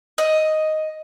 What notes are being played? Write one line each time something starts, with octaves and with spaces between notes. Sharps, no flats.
D#5